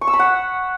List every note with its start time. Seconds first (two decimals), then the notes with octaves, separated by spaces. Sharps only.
0.01 C#6
0.07 E6
0.13 B5
0.19 F#5